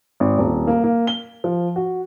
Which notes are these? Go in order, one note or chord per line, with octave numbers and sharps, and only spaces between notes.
G#1
D#1
A#3
A#3
G7
F3
F#4